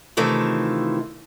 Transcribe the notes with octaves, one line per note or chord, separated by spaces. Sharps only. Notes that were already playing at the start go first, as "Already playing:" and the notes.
C3 D#3 E3 A3 F4